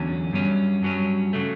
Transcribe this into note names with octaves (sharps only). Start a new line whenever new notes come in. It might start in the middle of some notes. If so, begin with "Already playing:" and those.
Already playing: E2 D3 F#3 C#4
G2 F#3 C#4
G2 F#3 C#4
C#3 F#3 A3